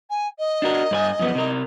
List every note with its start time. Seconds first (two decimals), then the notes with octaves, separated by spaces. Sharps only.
0.10 G#5
0.39 D#5
0.62 D4 F#4 A#4
0.91 G2 B4 G#5
1.19 F#2 F3 B3
1.35 C3 A#4